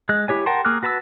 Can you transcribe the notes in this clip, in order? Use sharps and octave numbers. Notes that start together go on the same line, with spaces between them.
G#3 F#6
E4 G4 C#5 G#5
A#4 F#5 G5 A5 C6
A#3 G#4 D6 F6 F#6
F#4 B4 A5 A#5 E6